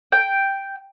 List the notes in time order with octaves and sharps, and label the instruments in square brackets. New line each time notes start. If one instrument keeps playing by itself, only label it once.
[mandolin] G5